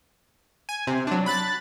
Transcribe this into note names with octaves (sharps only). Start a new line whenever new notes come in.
G#5
C3
F#3 D4
B5 F#6 A6